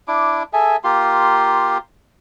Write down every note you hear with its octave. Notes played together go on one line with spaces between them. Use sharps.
D4 E4 D6
G#4 A4 E5 G#5
A#3 F4 G4 C6